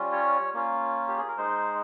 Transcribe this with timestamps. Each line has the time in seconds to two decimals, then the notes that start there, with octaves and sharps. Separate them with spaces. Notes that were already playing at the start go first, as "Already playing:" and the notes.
Already playing: G3 C#4 F4
0.12 C#5
0.54 A#3 C#4 F4
1.08 G4
1.18 G#4
1.28 A#4
1.37 G#3 D#4 C5